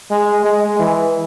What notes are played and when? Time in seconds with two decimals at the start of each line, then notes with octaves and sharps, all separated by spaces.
0.11 G#3
0.45 G#3
0.79 E3